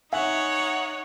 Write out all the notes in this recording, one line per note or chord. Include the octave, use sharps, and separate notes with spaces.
D#4 C#5 E5 F#5 G#5